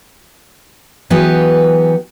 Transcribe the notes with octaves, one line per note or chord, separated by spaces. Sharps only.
E3 F#3 B3 G4 G#4